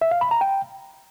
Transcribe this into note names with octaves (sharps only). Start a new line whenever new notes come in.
E5
F5
B5
A#5
G5